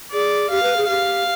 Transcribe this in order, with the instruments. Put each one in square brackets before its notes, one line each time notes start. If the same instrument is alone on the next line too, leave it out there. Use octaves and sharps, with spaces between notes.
[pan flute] G#4 [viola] D5
[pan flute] G4 [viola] F5
[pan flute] B4
G#4
[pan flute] G4 [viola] F5